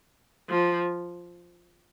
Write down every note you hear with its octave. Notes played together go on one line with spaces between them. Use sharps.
F3